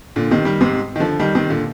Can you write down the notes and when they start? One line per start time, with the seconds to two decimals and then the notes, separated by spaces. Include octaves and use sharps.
0.16 A#2 D3
0.31 C3 D#3
0.45 D#3 G3
0.61 G#2 C3
0.96 D#3
1.00 D3 F3
1.20 D#3 G3
1.35 C3 D#3
1.50 A#2 D3